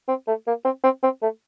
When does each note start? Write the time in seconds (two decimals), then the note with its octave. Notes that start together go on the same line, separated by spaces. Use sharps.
0.08 C4
0.28 A3
0.47 A#3
0.65 C4
0.84 C4
1.03 C4
1.22 A3